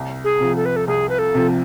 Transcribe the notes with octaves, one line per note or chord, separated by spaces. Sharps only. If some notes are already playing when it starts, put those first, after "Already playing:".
Already playing: C2
G#4
C3 F3
A4
B4
A4
C2 G#4
B4
A4
C3 F3